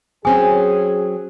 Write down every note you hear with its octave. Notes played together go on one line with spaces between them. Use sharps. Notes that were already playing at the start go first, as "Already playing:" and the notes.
F#3 C4 C#4 G#4 G#5 D#6